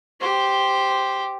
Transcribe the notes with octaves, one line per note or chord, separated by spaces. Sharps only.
G4 C5